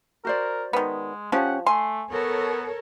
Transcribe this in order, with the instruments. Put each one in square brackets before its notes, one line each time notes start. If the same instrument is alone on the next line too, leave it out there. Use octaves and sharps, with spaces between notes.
[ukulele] F#4 C5 D5 [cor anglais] A#4
[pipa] D#3 B3 [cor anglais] G#3
[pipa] F3 [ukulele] C#4 G4 C#5 [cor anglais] F#5
[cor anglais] A3 [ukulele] G#5 [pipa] C6
[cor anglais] B3 [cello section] A4 A#4 C#5